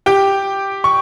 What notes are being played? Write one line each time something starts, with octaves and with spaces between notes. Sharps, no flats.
G4 G5
C#6